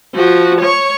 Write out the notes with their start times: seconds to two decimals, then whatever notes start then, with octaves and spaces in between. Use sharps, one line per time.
0.15 F3 F#4
0.60 C#5 C#6